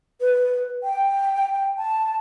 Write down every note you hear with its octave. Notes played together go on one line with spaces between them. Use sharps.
B4
G5
A5